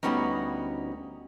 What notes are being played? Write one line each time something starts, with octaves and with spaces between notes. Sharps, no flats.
D2 F#3 G3 B3 C#4 D#4